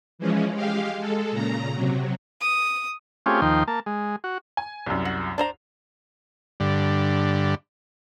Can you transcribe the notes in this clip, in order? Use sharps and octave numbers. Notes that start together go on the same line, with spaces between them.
E3 F3 G#3 C#4
G#3 G4 F5
G#3 A4
A#2 C#3 A#5
C3 F#3
D#6
A3 C4 C#4 F4 G4 G#4
D#2 F3 D#4 G5 C6
A#3 A5
G#3
F#4
G#5
C2 F#2
F#4
D4 C5 A#5
G2 D3